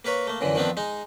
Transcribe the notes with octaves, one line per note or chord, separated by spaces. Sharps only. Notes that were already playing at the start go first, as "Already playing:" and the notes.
A#3 A#4 B4 C#5
A3 A#3
F#2 A#2 D3 E3
D#3 F3 B3 C4 D4
G#3 D#4